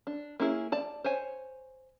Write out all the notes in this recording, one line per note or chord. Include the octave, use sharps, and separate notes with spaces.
D4
A#3 C#4 E4 G#4
D5 A5
C5 C#5 G#5